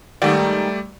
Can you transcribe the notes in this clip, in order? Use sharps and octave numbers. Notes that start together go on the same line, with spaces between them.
G#2 D#3 G3 A3 G4 D5